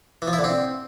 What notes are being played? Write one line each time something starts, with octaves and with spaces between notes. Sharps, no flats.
E3
F3
E4
D3
C4